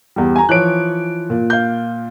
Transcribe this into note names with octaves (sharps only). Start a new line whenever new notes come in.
E2 G3
G#5 A#5
E3 F3 C#5 F#6 D7
A#2
F5 G6